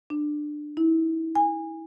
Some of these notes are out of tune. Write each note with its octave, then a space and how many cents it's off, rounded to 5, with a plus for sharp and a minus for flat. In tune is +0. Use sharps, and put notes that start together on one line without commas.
D4 +20
E4 -25
G#5 -25